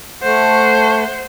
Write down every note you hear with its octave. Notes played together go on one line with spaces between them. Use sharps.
A3 C5 F#5